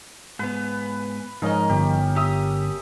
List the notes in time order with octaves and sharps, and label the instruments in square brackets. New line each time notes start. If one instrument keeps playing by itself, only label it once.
[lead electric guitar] G#2 B3 [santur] B4
[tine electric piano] G#2 [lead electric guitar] F3 D#5 [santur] C#4 D#4 A#4
[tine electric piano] G1 [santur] G4
[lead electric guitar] G4 [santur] E5 D#6